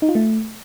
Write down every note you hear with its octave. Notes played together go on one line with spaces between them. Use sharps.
D#4
F4
A3